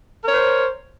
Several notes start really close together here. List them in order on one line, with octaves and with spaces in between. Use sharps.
A#4 C#5 C5